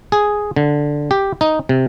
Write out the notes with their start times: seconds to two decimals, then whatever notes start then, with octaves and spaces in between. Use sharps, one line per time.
0.12 G#4
0.56 D3
1.11 G4
1.41 D#4
1.69 C3